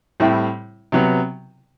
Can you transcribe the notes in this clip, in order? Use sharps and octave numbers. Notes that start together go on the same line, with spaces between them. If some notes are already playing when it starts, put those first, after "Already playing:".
A2 G3 C4 E4
C3 F#3 B3